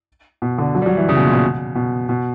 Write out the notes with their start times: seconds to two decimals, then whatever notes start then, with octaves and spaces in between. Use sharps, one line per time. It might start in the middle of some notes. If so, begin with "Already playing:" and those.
0.42 B2
0.58 D3
0.75 F#3
0.82 G3
0.86 F#3
0.97 E3
1.09 C#3
1.17 B2
1.25 A#2
1.33 B2
1.75 B2
2.09 B2